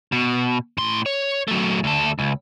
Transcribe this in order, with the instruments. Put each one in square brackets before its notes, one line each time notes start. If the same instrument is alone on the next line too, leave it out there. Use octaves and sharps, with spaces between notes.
[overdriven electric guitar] B2
A2 C6
C#5
F#3 A3
D2 A4
C#2